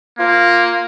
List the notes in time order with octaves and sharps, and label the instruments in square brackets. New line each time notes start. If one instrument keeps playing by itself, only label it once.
[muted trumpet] A#3 [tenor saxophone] F4